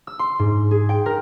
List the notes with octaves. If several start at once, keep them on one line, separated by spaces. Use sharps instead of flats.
E6
C6
G#2
G#4
G5
A#4